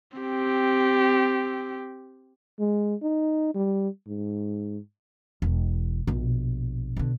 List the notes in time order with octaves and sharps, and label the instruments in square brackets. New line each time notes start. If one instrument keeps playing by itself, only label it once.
[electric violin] C4 G4
[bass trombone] G#3
D#4
G3
G#2
[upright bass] E1
A#1 B2
B2 D3